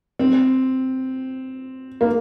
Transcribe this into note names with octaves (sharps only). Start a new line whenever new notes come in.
C4
A#3